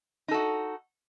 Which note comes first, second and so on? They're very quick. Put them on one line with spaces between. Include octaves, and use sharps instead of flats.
D#4 A4 F#4